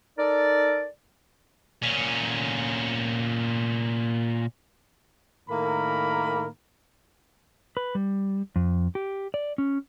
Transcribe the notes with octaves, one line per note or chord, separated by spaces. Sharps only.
D#4 A4 A#4 D5
A#2 C#4
A2 D#3 A#3 A#4 B5
B4
G3
F2
G4
D5
C#4